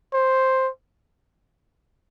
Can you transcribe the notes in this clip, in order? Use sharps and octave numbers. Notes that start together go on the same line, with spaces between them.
C5